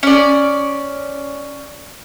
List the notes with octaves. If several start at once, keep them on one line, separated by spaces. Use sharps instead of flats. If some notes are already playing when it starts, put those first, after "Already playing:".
C#4 D5